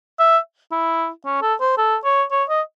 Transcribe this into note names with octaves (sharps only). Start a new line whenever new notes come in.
E5
E4
C#4
A4
C5
A4
C#5
C#5
D#5